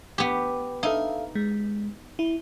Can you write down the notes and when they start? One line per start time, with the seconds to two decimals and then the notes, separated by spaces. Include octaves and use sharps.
0.18 B3 G4
0.83 D#4 A4 E5 F5
1.35 G#3
2.19 E4